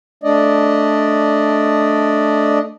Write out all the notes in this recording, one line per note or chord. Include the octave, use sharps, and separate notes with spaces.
A3 D4 D5 D#5